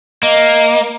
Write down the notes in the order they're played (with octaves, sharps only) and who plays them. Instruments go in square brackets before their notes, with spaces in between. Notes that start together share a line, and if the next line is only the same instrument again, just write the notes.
[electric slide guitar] A#3 [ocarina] D#5